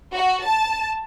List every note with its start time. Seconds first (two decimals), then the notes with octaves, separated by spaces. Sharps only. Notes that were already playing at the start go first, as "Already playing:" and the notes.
0.15 F#4
0.45 A5